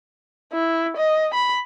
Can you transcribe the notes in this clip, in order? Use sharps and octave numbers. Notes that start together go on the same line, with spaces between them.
E4
D#5
B5